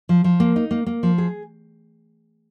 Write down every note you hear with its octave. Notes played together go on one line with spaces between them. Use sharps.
F3
F3
A#3
D#4
A#3
A#3
F3
G#4